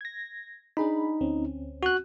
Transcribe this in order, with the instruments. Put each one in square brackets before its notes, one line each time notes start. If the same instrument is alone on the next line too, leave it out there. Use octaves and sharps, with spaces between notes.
[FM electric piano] G#6 A#6
[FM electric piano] D4 G#4 B5 [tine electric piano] D#4
[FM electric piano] D2 C4 C#4
[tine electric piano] F#4 F#6